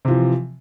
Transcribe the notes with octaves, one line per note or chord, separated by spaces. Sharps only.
C3 E3 F3